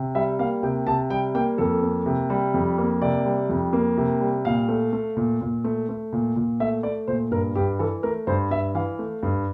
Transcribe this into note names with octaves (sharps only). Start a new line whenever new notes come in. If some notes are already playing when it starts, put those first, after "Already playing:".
Already playing: C3
G3 E5
A#3 F5
C3 G5
C3 A5
G3 G5
A#3 G5
F2 A4
A#3
C3
G3
F2
A#3
C3 D5
G3
F2
A#3
C3
G3
A#2 F5
A3
A3
A#2
A#2
A3
A3
A#2
A#2
A3 E5
A3 D5
A#2 C5
G2 A#4
G2 G4
E3 A4
A3 A#4
G2 C5
G2 E5
E3 F5
A3
G2